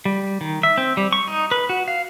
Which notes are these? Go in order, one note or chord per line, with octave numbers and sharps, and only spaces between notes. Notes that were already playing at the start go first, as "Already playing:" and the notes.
G3
D#3
E5
C4
G3
C#6
D#4
B4
F#4
F5